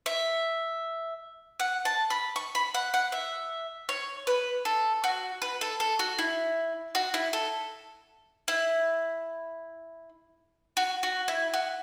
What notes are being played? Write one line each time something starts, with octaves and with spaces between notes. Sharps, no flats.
E5
F#5
A5
B5
C#6
B5
F#5
F#5
E5
C#5
B4
A4
F#4
B4
A4
A4
F#4
E4
F#4
E4
A4
E4
F#4
F#4
E4
F#4